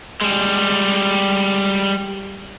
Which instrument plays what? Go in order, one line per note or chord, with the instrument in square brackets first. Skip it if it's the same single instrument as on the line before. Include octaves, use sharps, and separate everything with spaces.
[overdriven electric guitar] G3 G#3